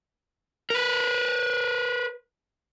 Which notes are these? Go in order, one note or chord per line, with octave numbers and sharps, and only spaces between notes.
A#4 B4